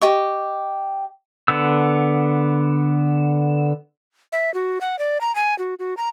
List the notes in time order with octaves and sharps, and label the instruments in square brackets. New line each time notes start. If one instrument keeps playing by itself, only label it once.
[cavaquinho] G4 D#5 C#6
[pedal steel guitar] D3 B3 E6
[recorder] E5
F#4
F#5
D5
A#5
G#5
F#4
F#4
A#5